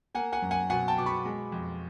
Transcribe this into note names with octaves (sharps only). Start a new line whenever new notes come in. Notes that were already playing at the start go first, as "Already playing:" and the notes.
A#3 F#5 G#5
F#5 G#5
F#2
F#5 G#5
B2 F#5 G#5
G5 A5
B2 D6
B5 C#6
G#3
F2